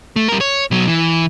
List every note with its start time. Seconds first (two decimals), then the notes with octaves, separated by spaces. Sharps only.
0.16 A3
0.28 G3 A#4
0.41 C#5
0.71 B2 F#3
0.88 E3